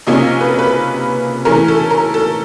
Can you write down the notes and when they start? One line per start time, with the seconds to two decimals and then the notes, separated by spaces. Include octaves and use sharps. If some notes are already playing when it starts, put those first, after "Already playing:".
0.07 C3 F3 A#3 C#4 D#5
0.41 B4
0.59 B4
1.45 E3 A3 C#4 A#4
1.68 A4
1.90 A#4
2.14 A4